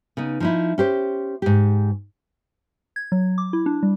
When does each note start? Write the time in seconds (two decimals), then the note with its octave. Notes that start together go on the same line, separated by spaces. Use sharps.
0.17 C#3 B3 D#4
0.40 F3 D#4 E4
0.78 C#4 G4 C5
1.42 G#2 G4
2.96 G#6
3.12 F#3
3.38 D6
3.53 E4
3.66 D4
3.83 G3